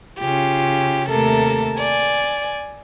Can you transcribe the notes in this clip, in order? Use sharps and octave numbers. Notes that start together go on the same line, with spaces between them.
C#3 F4 G4
D#2 C3 A3 A4 A#4 A5
D5 G#5